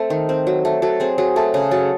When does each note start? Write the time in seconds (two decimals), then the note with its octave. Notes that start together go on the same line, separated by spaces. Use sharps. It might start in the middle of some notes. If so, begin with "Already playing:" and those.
Already playing: A3 C4 A4
0.10 D#3
0.29 C4
0.47 F#3
0.65 A3
0.82 F#3 A4
1.00 C4 G#4
1.18 F#3 G#4
1.36 A3 A4
1.54 C#3 G#4
1.71 F#3 A4